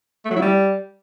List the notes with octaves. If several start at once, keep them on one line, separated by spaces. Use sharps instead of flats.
A3
F#3
E4
G3